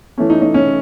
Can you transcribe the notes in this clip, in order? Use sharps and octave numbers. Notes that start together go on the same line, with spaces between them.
E3 A3 C#4
D#4
D#4
C#4